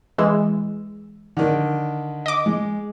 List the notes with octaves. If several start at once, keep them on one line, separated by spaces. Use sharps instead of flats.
E3 G#3 E6
D3 D#3
D#5 D6
G#3